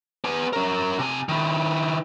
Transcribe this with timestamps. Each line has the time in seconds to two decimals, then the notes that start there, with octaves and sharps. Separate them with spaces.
0.24 B3 G#5
0.53 C#4 A#4
0.99 C3 G#5
1.29 D#3 E4